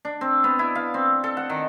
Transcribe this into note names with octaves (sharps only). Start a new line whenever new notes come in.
D4
C4
B3
E4
F5
C4
A4
F#5
D#3